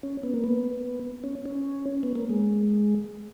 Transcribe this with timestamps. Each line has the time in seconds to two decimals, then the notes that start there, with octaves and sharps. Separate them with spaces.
0.03 C#4
0.23 B3
0.34 A#3
0.44 B3
1.24 C#4
1.46 C#4
2.03 B3
2.15 A#3
2.29 G#3